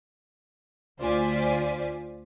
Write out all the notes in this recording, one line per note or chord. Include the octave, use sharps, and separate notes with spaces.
D2 F4 C5 D5 G#5 B6